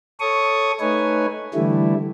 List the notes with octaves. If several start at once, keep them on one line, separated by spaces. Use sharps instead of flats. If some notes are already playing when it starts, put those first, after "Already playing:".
A4 C#5 C#6 D#6
A3 D#4 B4 C#5 G#5
D3 E3 G3 A3 E4